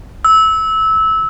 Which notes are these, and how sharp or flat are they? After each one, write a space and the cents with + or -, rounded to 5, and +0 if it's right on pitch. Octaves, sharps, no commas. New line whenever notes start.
E6 -20